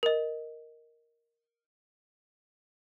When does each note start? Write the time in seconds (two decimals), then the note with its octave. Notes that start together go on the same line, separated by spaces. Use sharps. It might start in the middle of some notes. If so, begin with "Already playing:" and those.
0.03 A#4 D#5